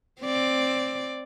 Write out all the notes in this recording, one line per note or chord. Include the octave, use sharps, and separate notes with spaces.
C4 D5